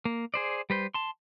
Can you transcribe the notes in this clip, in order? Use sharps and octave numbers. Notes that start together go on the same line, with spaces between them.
A#3
G#4 C5 D5
G3 B4 C5
A5 C6